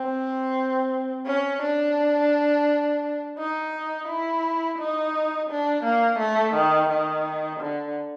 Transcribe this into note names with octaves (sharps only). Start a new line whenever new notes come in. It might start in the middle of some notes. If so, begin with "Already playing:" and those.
Already playing: C4
C#4
D4
D#4
E4
D#4
D4
A#3
A3
D#3
D#3
D3